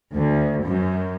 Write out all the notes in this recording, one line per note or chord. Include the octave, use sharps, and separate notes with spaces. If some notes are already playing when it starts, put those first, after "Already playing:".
D2
F#2